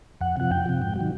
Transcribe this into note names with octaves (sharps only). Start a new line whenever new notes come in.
F2 F#5
C3 F3 F#5
F2 G5
C3 F3
G#2
D#3 F#3